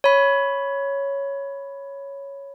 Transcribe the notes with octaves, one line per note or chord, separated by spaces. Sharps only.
C#5 B5